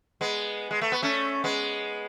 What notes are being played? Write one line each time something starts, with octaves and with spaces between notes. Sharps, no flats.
G#3 B3
G#3
A3
B3
A3 C#4
G#3 B3